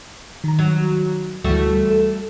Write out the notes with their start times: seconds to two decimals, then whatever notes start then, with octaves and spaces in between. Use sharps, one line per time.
0.44 D#3 A#5
0.59 F#3
1.44 D2 E3 G3 A3 F#4
1.90 A4